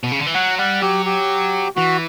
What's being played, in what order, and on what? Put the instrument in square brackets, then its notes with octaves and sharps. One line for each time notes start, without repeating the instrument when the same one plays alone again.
[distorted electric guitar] B2
C#3
D3
E3
[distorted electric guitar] F#3 [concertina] F#5
[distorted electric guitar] G3 [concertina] F#5
[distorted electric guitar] F#3 [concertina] G4
[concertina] G4
[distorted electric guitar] E3 [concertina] F#4